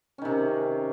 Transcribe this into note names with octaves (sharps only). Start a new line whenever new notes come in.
C3 D#3 C#4